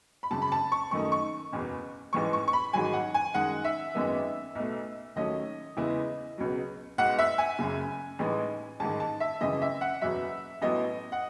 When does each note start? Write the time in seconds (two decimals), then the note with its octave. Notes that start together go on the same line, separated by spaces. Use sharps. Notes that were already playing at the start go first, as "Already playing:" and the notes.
0.23 B5
0.31 G#1 F#2 C#3 A5
0.42 B5
0.52 A5
0.72 C#6
0.91 F#2 D#3 A3 D#4 C#6
1.12 C#6
1.53 F#1 E2 B2
2.13 A1 G#2 E3 G#3 C#6
2.33 C#6
2.48 C#6
2.53 B5
2.73 A1 G#2 D#3 F#3 G#5
2.93 F#5
3.14 G#5
3.34 F#2 D#3 G#3 D#4 F#5
3.65 E5
3.95 G#1 F#2 D#3 G#3 B3
4.55 B1 B2 A3
5.16 D#2 D#3 F#3 A3 C#4 D#5
5.77 E2 C#3 G#3 B3 E4
6.38 C#2 B2 F#3
6.98 B1 B2 G#3 F#5
7.19 E5
7.38 G#5
7.59 F#1 F#2 C#3
8.19 A1 A2 E3 G#3 D#4
8.80 A1 G#2 D#3 A5
9.00 A5
9.20 E5
9.41 G#1 F#2 C#3 E3 D#5
9.62 E5
9.81 F#5
10.01 F#1 E2 B2 F#3 E5
10.62 A1 A2 F#3 B3 D#5
11.12 F#5